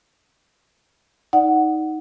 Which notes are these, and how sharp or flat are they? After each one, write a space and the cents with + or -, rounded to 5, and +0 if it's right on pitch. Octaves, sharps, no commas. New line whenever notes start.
D#4 +15 D5 +5 F#5 +0